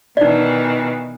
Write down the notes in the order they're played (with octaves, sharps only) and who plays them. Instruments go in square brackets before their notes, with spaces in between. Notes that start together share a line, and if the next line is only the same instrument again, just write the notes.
[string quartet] B2 D#3 E3 [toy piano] D#4 D5